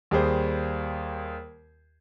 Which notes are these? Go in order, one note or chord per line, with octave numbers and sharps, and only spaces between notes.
D#2 G3 G#4 C5